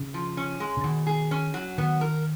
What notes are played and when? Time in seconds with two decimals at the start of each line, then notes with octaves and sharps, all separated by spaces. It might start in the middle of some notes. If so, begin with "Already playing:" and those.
Already playing: C#3
0.14 F3
0.37 C#4
0.60 G#3
0.77 C#3
0.84 B2 D#3
1.07 G#4
1.31 C#4
1.54 F#3
1.78 D#3 B3
2.01 A#4